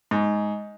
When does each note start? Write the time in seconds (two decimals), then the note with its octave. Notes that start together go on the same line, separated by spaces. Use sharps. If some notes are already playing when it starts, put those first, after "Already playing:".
0.11 G#2